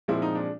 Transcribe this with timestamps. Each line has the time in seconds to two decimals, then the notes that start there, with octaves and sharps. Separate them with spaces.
0.08 A#2 F3 G#3 C4 E4
0.22 D#4
0.35 D4